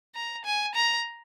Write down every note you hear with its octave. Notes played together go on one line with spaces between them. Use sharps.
A#5
G#5
A#5